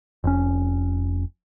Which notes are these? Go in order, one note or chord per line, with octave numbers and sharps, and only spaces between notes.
F1 C#4